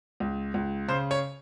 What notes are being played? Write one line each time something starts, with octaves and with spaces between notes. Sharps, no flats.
C#2
C#2
C#3 C5
C#5